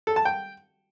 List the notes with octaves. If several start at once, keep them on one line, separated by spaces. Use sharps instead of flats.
A4
A5
G5